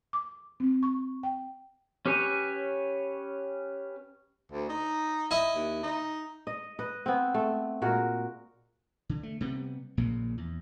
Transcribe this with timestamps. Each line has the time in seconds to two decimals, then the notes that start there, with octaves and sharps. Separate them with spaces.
0.13 D6
0.60 C4
0.83 C#6
1.23 G5
2.06 C#4 G4 B4 C#5 G#5
4.52 D2
4.70 D#4
5.31 E4 D#5
5.55 D#2
5.83 D#4
6.47 D#5
6.79 B4 D#5
7.06 B3 C4
7.34 A3
7.82 A#2 G#3 F#4 A#4
9.09 D3
9.23 A3
9.41 C3 G3 B3
9.97 A#1 A#2 C#3 A#3
10.38 E2